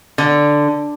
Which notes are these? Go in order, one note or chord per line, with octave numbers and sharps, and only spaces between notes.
D3